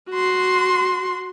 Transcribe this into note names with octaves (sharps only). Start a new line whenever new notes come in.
F#4 C6